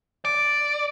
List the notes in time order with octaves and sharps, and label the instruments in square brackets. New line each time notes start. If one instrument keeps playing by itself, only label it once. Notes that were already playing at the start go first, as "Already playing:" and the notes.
[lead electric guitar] D5